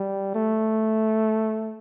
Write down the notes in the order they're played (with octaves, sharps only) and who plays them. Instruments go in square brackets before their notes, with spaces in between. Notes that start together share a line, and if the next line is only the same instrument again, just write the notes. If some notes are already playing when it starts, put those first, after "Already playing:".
Already playing: [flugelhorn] G3
A3